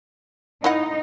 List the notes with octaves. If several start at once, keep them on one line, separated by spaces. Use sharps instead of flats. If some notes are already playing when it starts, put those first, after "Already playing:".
D#4 E4 D#5 F#5